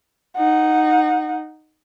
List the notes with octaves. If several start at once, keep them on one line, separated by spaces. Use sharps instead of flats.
D#4 F#5